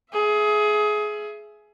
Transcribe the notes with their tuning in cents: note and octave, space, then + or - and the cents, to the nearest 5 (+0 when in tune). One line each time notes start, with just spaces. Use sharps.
G#4 +20 E5 +20